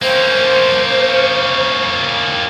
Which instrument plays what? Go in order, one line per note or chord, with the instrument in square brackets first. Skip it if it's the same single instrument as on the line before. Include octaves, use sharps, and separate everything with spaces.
[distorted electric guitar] A#3 C#4 [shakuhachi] C5